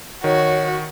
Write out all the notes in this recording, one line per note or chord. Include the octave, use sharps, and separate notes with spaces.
D#3 F#4 C#5